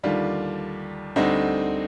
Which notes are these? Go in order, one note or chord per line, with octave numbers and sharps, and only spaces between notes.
D#2 D3 G3 D4 F4
D2 D3 G3 C4 D#4